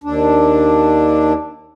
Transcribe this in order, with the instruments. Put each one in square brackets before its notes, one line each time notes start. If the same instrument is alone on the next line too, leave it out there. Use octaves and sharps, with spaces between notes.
[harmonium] D#2 D4